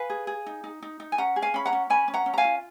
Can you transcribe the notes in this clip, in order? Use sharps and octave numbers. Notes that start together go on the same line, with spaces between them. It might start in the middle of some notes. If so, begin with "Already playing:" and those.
Already playing: B4 F5 G#5
G#4
G#4
D#4
D#4
D#4
D#4
G#5
C#4 F#5 A#5
G#4
F5 G#5
C#4 B5
F#5 A#5
C#4
C#4 G#5 B5
C#4
F#5 A#5
C#4
A#5
F5 G#5
F4